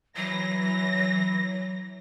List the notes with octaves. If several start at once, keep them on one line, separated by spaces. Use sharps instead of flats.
E3 F#3 A#6